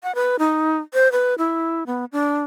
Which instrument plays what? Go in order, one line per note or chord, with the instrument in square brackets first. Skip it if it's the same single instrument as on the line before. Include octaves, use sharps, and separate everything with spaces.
[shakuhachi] F#5
B4
D#4
C5
B4
E4
B3
D4